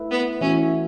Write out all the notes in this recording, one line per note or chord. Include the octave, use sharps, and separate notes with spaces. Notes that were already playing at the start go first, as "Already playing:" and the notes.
Already playing: A3 E4 B4 E5
B3
E3 A3 C#4 F#4 C#5 E5